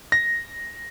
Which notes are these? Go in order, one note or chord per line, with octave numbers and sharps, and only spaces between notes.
A#6